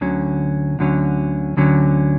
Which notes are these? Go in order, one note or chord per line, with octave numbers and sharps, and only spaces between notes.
D2 D3 F#3 C#4
D2 D3 F#3 C#4
D2 D3 F#3 C#4